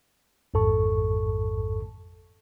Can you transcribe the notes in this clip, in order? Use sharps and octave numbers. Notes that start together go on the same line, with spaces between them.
A1 F2 G#2 A4 A5 C#6